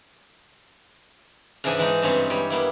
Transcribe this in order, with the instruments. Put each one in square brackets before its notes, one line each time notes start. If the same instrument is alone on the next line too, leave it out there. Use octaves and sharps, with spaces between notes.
[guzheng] G#2 C#3 E3 D4 G#4 G#5
E3 G#3 D#4
G2 C#3 G#3 C4 C#5
G3 C#5
A#3 B3 E4